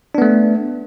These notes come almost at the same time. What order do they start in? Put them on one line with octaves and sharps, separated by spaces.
D4 B3 A3